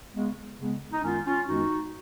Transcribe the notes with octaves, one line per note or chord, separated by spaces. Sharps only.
C#3 G#3 B3
C#3 G#3 B3
D#4
F#2 D#3 G#3 B3 C#4 F4
C#4 F4
F#2 D#3 G#3 B3 D#4 F#4